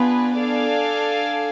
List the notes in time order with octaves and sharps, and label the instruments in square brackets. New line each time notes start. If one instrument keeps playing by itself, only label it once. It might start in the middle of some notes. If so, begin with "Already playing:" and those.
Already playing: [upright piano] B3 [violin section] D4 F4 G#4 B4
[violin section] D4 A4 D5 F5 G#5